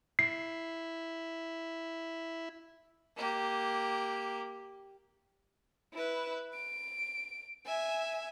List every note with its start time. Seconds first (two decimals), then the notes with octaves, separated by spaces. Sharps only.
0.19 E4 C7
3.17 A#3 G4
5.94 E4 B4
6.54 D7
7.66 E5 G#5